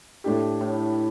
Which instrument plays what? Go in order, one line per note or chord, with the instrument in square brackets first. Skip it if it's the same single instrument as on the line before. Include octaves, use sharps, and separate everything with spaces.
[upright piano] A2 A3 D4 G4
[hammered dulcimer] A2